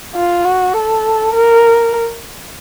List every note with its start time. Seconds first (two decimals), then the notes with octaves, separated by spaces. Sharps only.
0.15 F4
0.45 F#4
0.74 A4
1.34 A#4